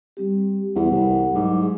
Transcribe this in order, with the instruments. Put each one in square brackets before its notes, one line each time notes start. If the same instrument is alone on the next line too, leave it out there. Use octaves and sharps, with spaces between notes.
[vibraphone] G3 C4 G4
[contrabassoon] E2 [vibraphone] F#5
[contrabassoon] C2
[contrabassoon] G#2 [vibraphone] F#3 D6
[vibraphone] G#4